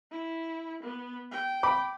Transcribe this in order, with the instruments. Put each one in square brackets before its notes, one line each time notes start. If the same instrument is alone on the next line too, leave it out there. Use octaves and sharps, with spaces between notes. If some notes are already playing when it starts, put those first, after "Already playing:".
[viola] E4
B3
G5
[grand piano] B5 D6